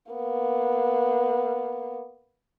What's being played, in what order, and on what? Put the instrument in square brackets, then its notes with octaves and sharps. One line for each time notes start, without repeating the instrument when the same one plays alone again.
[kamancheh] A#3 B3